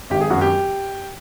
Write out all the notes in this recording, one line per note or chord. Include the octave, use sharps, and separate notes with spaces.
G#1 G4
G#4
F#2 F#4
G4